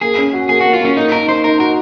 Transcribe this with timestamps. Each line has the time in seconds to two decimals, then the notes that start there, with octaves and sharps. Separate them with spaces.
0.01 A#3 G#4
0.18 C#4
0.33 F#4
0.49 A#3 G#4
0.61 A#3 F#4
0.73 F4
0.80 A#3 C#4
0.97 A#3 D#4
1.12 D#4 A#4
1.28 D#4 C5
1.44 D#4 A#4
1.59 F#4 A#4